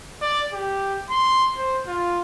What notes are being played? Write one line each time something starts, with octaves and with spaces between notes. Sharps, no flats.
D5
G4
C6
C5
F4